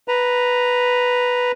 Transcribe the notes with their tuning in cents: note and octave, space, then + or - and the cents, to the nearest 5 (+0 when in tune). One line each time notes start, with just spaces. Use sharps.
B4 +0 A#5 +0